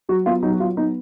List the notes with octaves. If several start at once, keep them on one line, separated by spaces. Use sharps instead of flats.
F#3 F#4
B3 F4
F#3 D#4
F#4
F#3 F4
B3 D#4